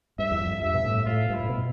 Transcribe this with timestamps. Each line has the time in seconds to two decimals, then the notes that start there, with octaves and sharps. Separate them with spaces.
0.18 G2 E5
0.31 E2
0.41 F2
0.62 G2 E5
0.74 B2
0.85 A2
1.05 A2 F4
1.30 G2
1.35 A2 E4
1.49 B2